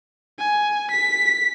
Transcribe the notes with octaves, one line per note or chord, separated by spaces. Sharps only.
G#5
B6